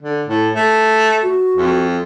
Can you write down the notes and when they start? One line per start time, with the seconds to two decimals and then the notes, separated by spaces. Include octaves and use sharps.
0.01 D3
0.28 A2
0.55 A3
1.23 F#4
1.56 F2